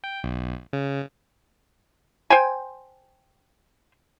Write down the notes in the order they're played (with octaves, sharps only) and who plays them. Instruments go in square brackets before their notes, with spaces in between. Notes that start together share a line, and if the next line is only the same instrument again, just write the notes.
[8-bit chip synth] G5
B1
C#3
[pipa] C5 G5 G#5